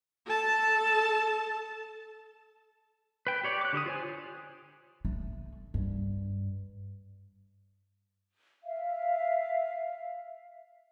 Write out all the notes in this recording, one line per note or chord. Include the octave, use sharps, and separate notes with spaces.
A4 A5
B4 G5
G4 C#5 D5
D6 F#6
D3 G4 D6 D#6
F4 C5 C#5 G#5
A3
G2
E5 F5